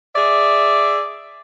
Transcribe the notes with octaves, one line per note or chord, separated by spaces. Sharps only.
G#4 D5 E5